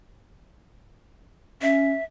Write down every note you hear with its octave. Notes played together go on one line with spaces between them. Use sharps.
C#4 E5